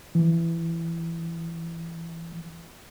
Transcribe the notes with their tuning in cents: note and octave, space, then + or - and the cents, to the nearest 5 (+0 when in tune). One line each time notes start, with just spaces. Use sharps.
E3 +15